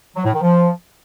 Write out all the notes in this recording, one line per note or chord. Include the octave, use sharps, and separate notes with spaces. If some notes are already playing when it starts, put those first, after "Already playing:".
F#3
A2
D#3
F3